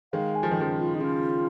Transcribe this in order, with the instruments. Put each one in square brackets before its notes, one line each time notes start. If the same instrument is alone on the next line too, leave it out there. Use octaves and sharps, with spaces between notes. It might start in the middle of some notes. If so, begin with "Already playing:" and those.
[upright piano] D#3 G#3 [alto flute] F5
[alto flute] G#5
[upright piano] F3
D#3
C#3 F3
[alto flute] F4
D#4
[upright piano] C#3 [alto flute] F4